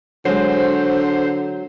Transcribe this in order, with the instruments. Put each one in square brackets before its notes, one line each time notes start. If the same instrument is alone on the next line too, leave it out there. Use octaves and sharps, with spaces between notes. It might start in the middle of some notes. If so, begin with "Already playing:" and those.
[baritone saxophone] D3 [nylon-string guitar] F#3 G#3 [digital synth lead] C5